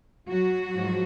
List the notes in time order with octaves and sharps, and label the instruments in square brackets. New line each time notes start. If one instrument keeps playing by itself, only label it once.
[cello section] F#3 F#4
G#2 F3